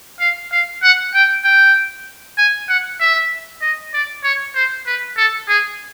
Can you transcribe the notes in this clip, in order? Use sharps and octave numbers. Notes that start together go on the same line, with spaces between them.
F5
F5
F#5
G5
G5
G#5
F#5
E5
D#5
D5
C#5
C5
B4
A4
G#4